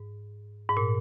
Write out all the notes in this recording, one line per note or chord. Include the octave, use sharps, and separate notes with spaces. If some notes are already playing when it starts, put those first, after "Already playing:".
Already playing: G#2
G#2
A#2